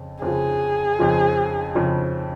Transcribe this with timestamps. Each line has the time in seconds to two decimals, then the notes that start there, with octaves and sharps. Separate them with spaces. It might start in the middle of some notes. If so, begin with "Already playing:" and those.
Already playing: F2 C#3
0.22 F2 C#3 F3 G#4
0.99 F2 C#3 F3
1.75 F2 C#3 F3